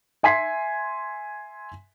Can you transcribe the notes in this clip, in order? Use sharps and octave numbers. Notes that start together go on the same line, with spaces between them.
E5 G#5 C6 B6 C7